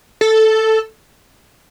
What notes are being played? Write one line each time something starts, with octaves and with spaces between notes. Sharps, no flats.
A4